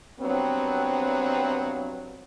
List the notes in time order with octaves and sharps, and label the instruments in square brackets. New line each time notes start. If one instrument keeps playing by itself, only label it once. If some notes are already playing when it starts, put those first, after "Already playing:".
[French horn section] G2 F#3 B3 C4